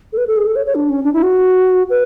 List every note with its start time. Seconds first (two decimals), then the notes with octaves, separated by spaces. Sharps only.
0.13 A4
0.18 B4
0.28 A4
0.37 G#4
0.47 A4
0.56 C#5
0.66 C#5
0.75 D4
0.89 C#4
1.04 D4
1.14 E4
1.23 F#4
1.90 B4